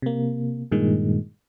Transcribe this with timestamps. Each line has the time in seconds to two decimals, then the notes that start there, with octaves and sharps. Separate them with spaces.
0.02 C3 A#3
0.72 G2 A#2 D#3 G#3